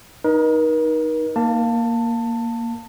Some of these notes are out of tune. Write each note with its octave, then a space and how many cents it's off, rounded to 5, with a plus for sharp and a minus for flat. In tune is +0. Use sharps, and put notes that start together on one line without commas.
D#4 +0 A#4 +40
A#3 +0 A5 +20